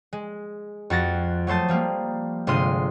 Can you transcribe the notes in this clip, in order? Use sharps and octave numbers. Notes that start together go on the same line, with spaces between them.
G#3
F2 F#4 A6 A#6
F#3 A3 C5 A5 D#6
F3 G3 A#3
G1 C3 G#3 F4 C6 D#6